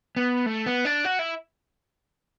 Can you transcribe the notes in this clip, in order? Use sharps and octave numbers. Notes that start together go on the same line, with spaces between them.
B3
A3
B3
D4
F#4
E4